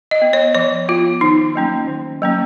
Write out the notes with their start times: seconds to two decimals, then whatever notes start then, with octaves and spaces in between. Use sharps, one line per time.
0.11 D#5
0.22 B3
0.33 C#5
0.54 F3 C#5
0.89 B3 F4
1.21 D#3 D#4
1.55 F#3 A#3 C#4
1.88 D#3
2.22 F#3 A#3 C#4